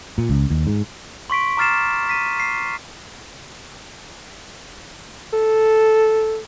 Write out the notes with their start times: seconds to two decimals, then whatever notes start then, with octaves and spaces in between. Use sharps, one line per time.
0.18 A#2
0.29 C#2
0.50 D#2
0.67 G#2
1.30 C6 C#6 B6 D7
1.57 A#5 D6 F6 A6 C7 E7
2.09 B6 D#7
2.40 C7
5.33 A4